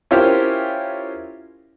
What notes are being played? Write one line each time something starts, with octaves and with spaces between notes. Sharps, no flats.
C#4 E4 F4 G4 A#4 C5